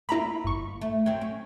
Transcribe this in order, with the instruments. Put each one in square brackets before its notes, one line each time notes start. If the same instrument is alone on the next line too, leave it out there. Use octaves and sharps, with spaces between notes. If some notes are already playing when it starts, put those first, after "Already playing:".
[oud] A#3 F4 [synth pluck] E4 A#5 B5
[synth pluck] G1 C#6
[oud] A3
F#3 C4
C#4